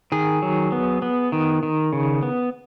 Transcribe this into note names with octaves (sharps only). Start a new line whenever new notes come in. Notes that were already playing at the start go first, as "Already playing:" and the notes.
D#3 G#4
F#3
B3
B3
D#3
D#3
C#3
B3